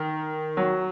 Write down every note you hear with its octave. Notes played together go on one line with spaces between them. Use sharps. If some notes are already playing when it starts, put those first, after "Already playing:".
Already playing: D#3
F#3